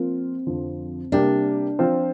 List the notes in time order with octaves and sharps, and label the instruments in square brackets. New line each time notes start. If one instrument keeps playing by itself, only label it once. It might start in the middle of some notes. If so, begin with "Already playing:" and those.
Already playing: [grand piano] F3 A#3 F4 A#4 [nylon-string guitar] C4
[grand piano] F2 D3 F3
[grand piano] C3 G3 A#3 G4 [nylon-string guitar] D4
[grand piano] F3 C4 F4 C5